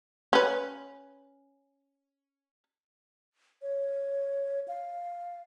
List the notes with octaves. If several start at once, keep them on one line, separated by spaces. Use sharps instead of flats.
C#4 B4
C#5
F5